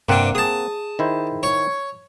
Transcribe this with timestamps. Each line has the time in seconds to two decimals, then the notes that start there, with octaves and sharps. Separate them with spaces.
0.09 G2 C3 A#3 C4 D4 F#5
0.35 G#4 A5 D#6
0.99 D#3 E4 C5
1.43 C#5